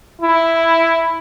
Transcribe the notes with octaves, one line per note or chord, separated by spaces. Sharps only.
E4